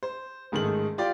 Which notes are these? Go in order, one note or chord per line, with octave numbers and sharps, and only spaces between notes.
C5
A1 G#2 D#3 G#3 A3 F#7
F4 G4 D5